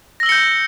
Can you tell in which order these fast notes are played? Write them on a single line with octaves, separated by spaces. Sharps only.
A#6 E6 G7 C#7 G6